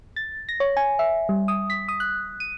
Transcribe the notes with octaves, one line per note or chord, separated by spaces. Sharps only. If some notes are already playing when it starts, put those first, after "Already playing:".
A6
A#6
C#5
G#5
E5
G3
D#6
B6
D#6
F#6
D#7